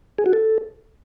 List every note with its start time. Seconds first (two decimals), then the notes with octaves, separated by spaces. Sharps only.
0.19 G#4
0.26 F#4
0.33 A4